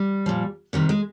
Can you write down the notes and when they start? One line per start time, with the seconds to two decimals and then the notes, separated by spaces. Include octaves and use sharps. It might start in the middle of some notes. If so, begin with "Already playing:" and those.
Already playing: G3
0.26 A#2 F3
0.73 C3 D#3 G3
0.89 G#3